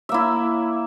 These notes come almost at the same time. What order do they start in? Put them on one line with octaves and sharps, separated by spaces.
E5 A#3 E4